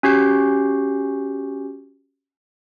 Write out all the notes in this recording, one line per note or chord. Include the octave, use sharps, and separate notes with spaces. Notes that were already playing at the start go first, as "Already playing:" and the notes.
C#4 F#4 G4 G6 C7